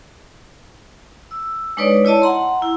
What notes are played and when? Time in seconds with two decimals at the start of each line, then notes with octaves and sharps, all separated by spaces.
1.31 E6
1.77 G#3 D4 D#4 B4 C#5 D5
2.05 E4 C#5 D#5 A5
2.22 F#5 A#5 C6
2.62 E4